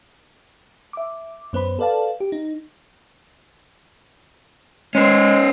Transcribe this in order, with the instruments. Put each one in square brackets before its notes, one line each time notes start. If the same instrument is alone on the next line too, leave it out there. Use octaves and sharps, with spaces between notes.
[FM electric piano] E5 D6
F#2 B3 C5 B5
A4 B4 D5 F5 A5
G4
D#4
[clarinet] G#3 [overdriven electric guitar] C#4 C5